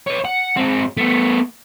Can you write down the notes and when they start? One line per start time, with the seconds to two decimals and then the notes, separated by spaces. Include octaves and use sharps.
0.07 B4 C#5
0.25 F#5
0.56 G#2 C4
0.97 A3 B3